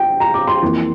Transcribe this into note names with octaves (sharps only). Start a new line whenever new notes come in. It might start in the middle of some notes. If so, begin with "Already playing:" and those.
Already playing: G5
A#5
D6
C6
F2 E3 A#3